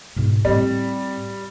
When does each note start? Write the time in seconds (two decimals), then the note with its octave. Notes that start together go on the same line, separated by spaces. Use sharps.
0.16 G#2 B2
0.45 A2 G3 C4